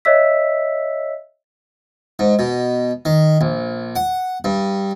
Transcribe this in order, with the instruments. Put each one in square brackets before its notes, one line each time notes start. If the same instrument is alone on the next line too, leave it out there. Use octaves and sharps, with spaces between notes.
[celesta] C#5 D#5 E5 E6 B6
[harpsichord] G#2
B2
D#3
A#1
F#5
G2